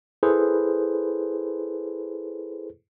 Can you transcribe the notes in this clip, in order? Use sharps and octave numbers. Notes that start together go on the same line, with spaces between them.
E4 G#4 A4 B4 C5